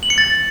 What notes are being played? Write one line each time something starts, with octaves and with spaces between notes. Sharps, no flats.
F#7
C#7
A6